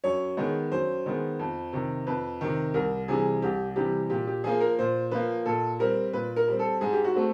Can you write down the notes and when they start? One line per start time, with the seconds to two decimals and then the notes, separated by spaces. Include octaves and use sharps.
0.04 F#2 C#5
0.37 D#3 G#3 B3
0.72 F#2 C5
1.06 D#3 G#3 B3
1.39 F2
1.73 C3 D#3
2.07 F2 B4
2.41 C3 D#3
2.74 C2 A#4
3.08 C3 E3 G3 G#4
3.42 C2 G4
3.76 C3 E3 G3 G4
4.10 A#2 G4
4.27 G4
4.44 F3 A#3 G#4
4.61 A#4
4.79 A#2 C5
5.11 F3 A#3 B4
5.46 A#2 A4
5.79 G3 C4 A#4
6.13 A#2 B4
6.36 A#4
6.48 G3 C4
6.59 A4
6.81 G#2 G#4
6.93 G4
7.04 F#4
7.16 A3 C4